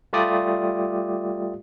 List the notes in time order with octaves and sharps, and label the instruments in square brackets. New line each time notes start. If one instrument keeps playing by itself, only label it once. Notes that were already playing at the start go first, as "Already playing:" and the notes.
[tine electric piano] G3 A3 F4 G4 D5 D#6